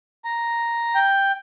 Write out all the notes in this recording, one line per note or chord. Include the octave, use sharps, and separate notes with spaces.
A#5
G5